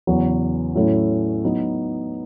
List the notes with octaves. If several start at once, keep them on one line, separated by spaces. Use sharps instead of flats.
E2 C#3 F#3 B3
A2 F#3 A3 C#4 E4
F#3 B3 D#4